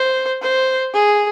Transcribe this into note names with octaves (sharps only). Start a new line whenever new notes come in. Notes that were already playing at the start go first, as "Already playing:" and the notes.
Already playing: C5
C5
G#4